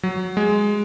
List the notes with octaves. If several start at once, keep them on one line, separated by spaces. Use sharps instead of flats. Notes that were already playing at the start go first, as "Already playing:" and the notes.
F#3
G#3